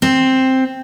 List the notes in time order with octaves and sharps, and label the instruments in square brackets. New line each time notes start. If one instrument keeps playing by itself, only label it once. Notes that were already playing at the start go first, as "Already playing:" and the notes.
[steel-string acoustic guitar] C4